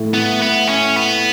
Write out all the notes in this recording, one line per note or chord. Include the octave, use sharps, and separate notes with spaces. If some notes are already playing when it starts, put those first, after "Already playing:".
Already playing: A2
B3
B3
C#4
B3